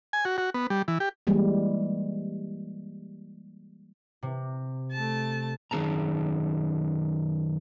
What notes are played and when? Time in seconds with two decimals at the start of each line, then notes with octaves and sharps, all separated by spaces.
0.13 G#5
0.25 F#4
0.38 F#4
0.54 B3
0.70 G3
0.88 E3
1.00 G4
1.27 E3 G3 G#3 A#3
4.23 C3
4.92 A3 A5
5.71 F#2 D#3 D4 G#4 A5 A#5